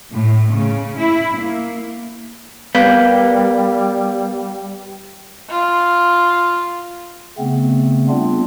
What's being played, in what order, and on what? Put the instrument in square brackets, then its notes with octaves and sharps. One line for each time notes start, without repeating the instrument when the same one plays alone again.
[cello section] A2
C#3
E4
A#3
[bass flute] G3 [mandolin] A#3 G6 [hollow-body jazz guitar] B3
[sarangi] F4
[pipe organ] C#3 A3 B3 C4
G3 B3 C4 D4 F4